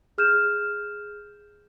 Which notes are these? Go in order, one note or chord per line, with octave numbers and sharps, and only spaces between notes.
G#4 F6 G6 E7